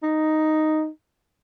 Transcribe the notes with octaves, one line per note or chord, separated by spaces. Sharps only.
D#4